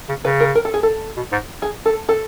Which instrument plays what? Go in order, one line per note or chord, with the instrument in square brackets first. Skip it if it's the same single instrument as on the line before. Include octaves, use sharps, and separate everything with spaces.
[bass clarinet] C#3
[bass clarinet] C#3 [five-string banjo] B4
[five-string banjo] A#4
A#4
A4
G#4
A4
[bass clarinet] B2
G#2
[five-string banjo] G#4
A4
A4